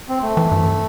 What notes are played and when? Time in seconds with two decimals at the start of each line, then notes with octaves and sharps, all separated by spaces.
0.09 C4
0.22 A3
0.37 E3
0.52 G2